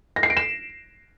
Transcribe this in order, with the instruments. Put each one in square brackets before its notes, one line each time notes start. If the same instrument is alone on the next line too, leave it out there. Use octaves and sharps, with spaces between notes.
[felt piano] A#6
C7
D7
E7